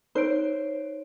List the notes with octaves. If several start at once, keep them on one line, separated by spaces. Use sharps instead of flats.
D#4 C5 C#5 D7